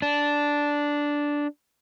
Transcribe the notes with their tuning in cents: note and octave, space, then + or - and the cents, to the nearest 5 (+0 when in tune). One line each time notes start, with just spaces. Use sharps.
D4 -5